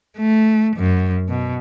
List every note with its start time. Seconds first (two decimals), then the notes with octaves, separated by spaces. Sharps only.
0.17 A3
0.76 F#2
1.29 B2